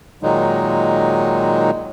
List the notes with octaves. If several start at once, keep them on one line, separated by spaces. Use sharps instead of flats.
A#2 D#3 F#3 G#3 D#4